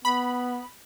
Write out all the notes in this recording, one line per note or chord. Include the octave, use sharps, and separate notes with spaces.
B3 B5